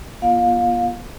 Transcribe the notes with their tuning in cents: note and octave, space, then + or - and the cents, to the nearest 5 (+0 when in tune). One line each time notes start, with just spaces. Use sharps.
B3 -45 F4 -15 F5 +25